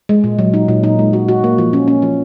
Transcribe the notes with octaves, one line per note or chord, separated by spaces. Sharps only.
G#3
A#2
F#3
D#4
A#2
D#4
G#3
F#4
F#4
A#3
F3
C#4
C#4
F3